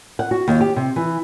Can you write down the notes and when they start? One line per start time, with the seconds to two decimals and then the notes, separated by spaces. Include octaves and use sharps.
0.19 F#5
0.31 F#4
0.48 D#2
0.61 G4
0.76 C3
0.96 E3